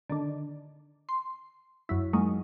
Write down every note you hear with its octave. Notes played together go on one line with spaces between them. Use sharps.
D3 D#3 D4
C6
F#2 F#3 E4
F#3 G#3 A#3 D#4